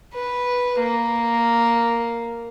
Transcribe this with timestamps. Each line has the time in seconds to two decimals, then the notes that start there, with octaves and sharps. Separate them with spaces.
0.14 B4
0.80 A#3